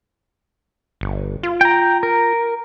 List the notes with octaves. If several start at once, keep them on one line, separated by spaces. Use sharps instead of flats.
G1
F4
G5 A#5
A#4